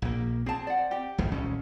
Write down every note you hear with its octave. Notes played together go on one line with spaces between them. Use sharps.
A#1 A#3
C4 G#4 A5
D5 F#5
G4
D#2 G#2
D#1 C2 C#4